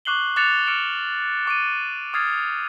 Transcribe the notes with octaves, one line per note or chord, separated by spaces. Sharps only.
C#6 D6 F#6 C7 F#7 G7
D6 F#6 A6 C#7 E7 F7
D6 F6 C#7 D7 E7
C#6 D6 D7 D#7
D6 D#6 F6 G#6 A6 C7